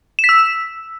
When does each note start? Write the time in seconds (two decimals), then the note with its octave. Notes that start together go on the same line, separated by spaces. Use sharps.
0.19 E7
0.24 B6
0.29 E6